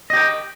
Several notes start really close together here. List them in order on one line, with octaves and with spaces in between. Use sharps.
D#5 G4 G5